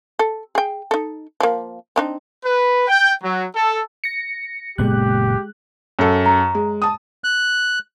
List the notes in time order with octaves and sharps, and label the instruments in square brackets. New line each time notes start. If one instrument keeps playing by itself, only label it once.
[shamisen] A4
G#4 G5
D#4 A4
F3 A#3
C4 D4 D#4
[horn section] B4
G5
F#3
A4
[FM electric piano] A#6 C#7
[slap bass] F#1 A#2 B3 [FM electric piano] G#3 F#6 [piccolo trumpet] G4
[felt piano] F#2 A4
[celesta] A#5
[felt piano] G#3
A5 D#6
[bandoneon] F#6